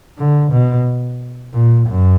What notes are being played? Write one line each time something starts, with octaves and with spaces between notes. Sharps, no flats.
D3
B2
A#2
F#2